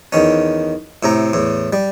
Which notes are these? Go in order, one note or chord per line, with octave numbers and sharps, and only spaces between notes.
E2 D#3 C#4
A2 C3 A#5
E2 A2
G3